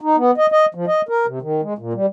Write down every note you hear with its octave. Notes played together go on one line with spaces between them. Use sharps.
D#4
B3
D#5
D#5
F3
D#5
A#4
C3
D#3
G#3
A#2
G3